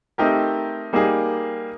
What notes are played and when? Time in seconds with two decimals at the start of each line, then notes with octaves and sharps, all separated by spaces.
0.18 A3 C4 D#4 G4 A#4
0.93 G3 A#3 D#4 G#4